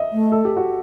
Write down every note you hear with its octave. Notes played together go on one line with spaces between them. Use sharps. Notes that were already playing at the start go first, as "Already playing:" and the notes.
Already playing: D#5 E5
A3
A4
G4
F#4